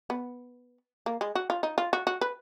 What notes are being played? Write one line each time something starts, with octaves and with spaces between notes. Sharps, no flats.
B3
A#3
G#3
F#4
F4
D#4
F4
F#4
F#4
B4